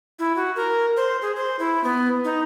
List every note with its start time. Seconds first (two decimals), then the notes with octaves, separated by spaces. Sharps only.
0.19 E4
0.36 F#4
0.56 A#4
0.97 C5
1.22 G#4
1.36 C5
1.59 E4
1.84 B3
2.24 D#4